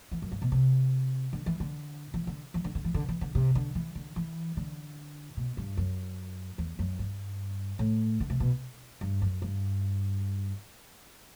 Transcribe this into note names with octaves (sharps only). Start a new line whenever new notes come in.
E3
F#2
G2
B2
C3
D3
E3
D3
E3
D3
E3
D3
D3
E3
D3
E3
D3
C3
D3
E3
D3
E3
D3
B2
G2
F#2
E2
F#2
G2
A2
D3
C3
B2
G2
F#2
G2